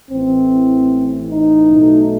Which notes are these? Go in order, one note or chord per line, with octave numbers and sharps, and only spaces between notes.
A1 A2 E3 C4
D#4
B1 B2 A3